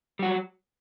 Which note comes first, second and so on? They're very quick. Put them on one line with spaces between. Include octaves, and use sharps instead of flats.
G3 F#4 F#3